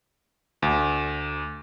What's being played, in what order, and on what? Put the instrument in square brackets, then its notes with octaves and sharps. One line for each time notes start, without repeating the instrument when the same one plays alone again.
[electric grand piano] D2